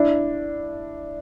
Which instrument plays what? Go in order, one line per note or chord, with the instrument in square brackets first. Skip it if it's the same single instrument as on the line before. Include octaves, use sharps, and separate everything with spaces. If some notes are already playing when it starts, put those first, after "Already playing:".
Already playing: [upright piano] D4 E4